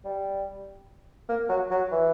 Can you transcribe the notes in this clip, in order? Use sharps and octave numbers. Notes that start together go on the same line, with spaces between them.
G3
A#3
F#3
F#3
E3